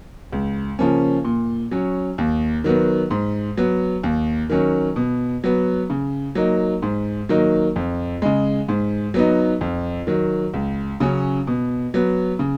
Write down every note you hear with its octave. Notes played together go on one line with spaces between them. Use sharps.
C#2
C#3 F3 A#3 C#4
A#2
F#3 C#4
D#2
D#3 F#3 B3
G#2
F#3 B3
D#2
D#3 F#3 C#4
B2
F#3 B3
C#3
F#3 A#3 D#4
G#2
D#3 F#3 A#3 D#4
F2
C#3 G#3
G#2
F#3 B3 D#4
F2
D#3 F#3
C#2
C#3 F#3 C#4
B2
F#3 B3
C#3